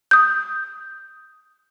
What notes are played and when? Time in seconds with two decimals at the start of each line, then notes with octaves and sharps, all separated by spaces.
0.11 D#6 G6